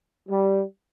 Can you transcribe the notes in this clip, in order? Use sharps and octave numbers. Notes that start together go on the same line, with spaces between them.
G3